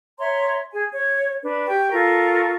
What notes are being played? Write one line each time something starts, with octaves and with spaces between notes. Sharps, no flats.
C#5 E5 A#5 C6
G#4 G#5
C#5
D4 B4
G4 G5 C#6
F4 A4 A#4 C#6